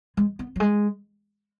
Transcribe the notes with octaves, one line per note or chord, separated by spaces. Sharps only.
G#3
B3
F#3
G#3